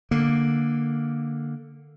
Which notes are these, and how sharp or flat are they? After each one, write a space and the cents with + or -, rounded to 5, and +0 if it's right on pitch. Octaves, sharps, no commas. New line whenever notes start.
D3 +5 A#3 +0